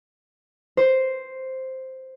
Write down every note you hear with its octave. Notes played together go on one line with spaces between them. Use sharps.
C5